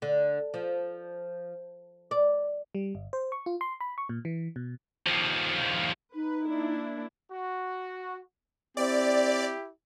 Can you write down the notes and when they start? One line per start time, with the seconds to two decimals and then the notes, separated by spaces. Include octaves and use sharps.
0.02 D3
0.54 F3
2.11 D5
2.75 G3
2.95 G1
3.13 C5
3.32 C#6
3.46 F4
3.61 C6
3.81 B5
3.98 C#6
4.09 A#2
4.25 E3
4.56 B2
5.07 D#2 F3
6.15 D#4 B4
6.47 A#3 D4 E4
7.31 F#4
8.77 C4 E4 G4 D5